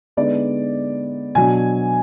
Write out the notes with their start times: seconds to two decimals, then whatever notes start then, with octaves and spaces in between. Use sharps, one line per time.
0.17 D3 G#3 B3 D#4 D5
1.35 B2 F#3 D4 G#5